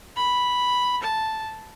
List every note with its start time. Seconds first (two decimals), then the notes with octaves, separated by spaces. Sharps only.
0.17 B5
1.03 A5